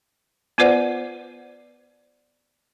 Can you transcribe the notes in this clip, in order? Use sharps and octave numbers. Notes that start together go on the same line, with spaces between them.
B3 F4 B4 C5 D5 F#5